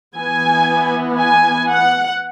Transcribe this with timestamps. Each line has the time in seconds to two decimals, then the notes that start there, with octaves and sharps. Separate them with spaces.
0.15 E3 B3 G#5
1.19 G#5
1.70 F#5